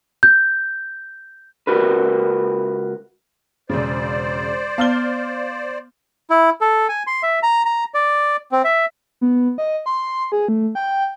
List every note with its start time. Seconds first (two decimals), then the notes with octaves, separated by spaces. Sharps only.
0.23 G6
1.67 C#2 F#4 A#4 B4
3.70 E1 C#3 C5 D5
4.78 B3 F5 F6 G7
6.30 E4
6.61 A4
6.89 G#5
7.07 C6
7.23 E5
7.43 A#5
7.65 A#5
7.94 D5
8.52 C4
8.64 E5
9.21 B3
9.58 D#5
9.86 C6
10.32 G#4
10.49 A3
10.75 G5